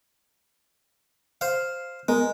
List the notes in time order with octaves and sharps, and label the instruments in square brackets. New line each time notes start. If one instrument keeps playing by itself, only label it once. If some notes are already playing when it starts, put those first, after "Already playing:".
[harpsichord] C5 F5
[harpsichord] G#3 [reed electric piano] B3 A#4